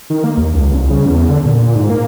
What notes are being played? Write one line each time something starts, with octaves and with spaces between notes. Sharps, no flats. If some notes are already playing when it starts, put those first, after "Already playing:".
D#3
A#3
D#2
C#2
C2
C#3
E2
D3
A#2
G#2
A#3